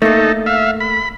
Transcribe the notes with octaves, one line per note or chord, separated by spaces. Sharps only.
A3 A#3 D#4 A4
E5 F5
B5